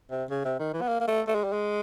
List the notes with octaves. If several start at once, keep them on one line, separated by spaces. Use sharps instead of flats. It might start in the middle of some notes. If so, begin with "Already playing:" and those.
C3
C#3
C3
D#3
E3
B3
A#3
A#3
A3
A3
G#3
G3
G#3